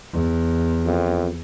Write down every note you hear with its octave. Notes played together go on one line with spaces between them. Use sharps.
E2
F2